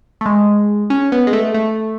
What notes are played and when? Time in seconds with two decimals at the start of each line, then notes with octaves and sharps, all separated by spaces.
0.21 A3
0.26 G#3
0.90 C#4
1.12 B3
1.27 G#3
1.33 A3
1.54 A3